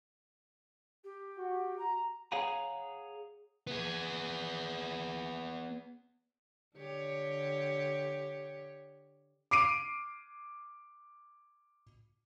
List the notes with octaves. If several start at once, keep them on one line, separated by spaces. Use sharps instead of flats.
G4
F#4
A#5
G#4 C#5 F5 F#5 G#5 A#5
B3 G#4
D3 G4 C#5
D6 C7 D7 D#7